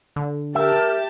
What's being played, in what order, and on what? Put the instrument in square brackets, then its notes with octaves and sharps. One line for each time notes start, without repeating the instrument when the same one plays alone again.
[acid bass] D3
[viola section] G4 A5 [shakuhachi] A#4 [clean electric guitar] E5